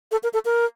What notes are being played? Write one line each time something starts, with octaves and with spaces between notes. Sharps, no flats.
A4
A#4
A4
A#4